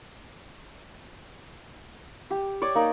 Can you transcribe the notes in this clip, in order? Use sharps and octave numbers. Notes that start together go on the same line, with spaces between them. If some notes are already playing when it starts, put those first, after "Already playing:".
G4
C#5 D5
A#3 D#4